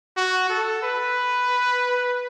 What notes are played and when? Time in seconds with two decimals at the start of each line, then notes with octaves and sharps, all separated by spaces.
0.17 F#4
0.50 A4
0.83 B4